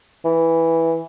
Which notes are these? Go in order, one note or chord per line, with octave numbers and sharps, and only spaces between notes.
E3